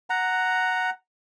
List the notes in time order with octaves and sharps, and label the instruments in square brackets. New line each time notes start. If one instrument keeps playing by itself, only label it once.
[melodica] F#5 A#5